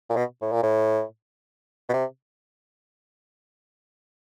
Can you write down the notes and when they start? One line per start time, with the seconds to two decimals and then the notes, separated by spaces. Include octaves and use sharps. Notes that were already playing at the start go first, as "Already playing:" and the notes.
0.10 A#2
0.16 B2
0.42 A2
0.52 A#2
0.63 A2
1.89 B2
1.93 C3